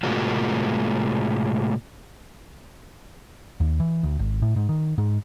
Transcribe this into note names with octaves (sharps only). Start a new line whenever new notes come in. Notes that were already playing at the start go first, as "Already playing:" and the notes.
A2 C3 G#3 A#3 F4 F#4
D#2
E3
D2
G#1
A2
G#2
D#3
G#2